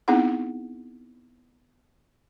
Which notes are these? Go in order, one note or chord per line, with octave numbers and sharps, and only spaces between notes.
B3 C4 D#4 E4 G#4 F#5